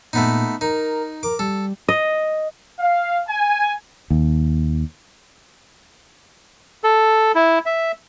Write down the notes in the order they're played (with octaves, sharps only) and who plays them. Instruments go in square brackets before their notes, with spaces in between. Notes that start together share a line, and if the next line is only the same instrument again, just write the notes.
[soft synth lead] A#2 [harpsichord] A3 B3 D#4
[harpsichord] D#4 [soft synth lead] A#4
[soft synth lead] A#4 [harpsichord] D6
[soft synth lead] G3 [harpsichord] A4
[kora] D#5
[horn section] F5
G#5
[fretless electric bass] D#2
[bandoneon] A4
E4
E5